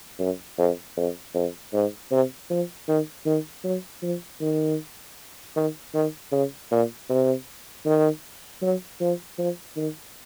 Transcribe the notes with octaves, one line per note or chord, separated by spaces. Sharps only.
F#2
F2
F2
F2
G#2
C3
F3
D#3
D#3
F#3
F3
D#3
D#3
D#3
C#3
A#2
C3
D#3
F#3
F3
F3
D#3